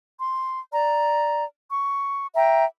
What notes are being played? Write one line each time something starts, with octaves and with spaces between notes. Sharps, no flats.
C6
D5 A#5
C#6
E5 G5 A#5